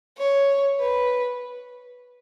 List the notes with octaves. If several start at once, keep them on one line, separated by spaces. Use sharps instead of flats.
C#5
B4